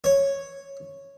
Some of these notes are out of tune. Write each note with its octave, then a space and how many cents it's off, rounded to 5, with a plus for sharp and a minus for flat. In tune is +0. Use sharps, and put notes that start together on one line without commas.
C#5 -5